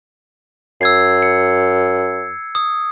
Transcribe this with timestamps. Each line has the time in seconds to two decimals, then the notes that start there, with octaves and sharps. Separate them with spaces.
0.81 F#2 E6 G#6 C7
1.22 C#7
2.55 D#6